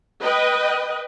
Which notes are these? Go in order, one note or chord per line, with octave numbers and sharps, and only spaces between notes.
B4 D#5 G5